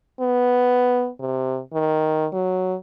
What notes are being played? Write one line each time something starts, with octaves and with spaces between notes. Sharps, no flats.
B3
C3
D#3
F#3